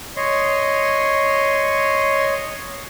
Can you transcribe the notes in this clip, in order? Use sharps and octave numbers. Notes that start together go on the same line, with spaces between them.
C#5 D#5 C6